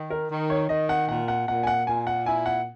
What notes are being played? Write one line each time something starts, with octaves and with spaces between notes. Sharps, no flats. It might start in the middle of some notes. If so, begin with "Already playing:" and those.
Already playing: D#3
A#4
D#3
C#5
D#3 D#5
F#5
A#2 F#5
F#5
A#2 F#5
G#5
F#5
A#2 G#5
F#5
E4 G#5
F#5